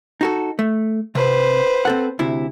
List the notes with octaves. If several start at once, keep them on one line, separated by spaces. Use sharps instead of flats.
D#4 F#4 A4
A3
C3 B4 C5
C4 A4 F#5
D2 C3 E4